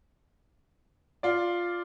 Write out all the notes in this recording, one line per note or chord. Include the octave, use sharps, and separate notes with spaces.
F4 D5